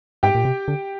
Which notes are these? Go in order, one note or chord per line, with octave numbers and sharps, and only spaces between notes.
G#2 G4 G5
A#2
C3
D3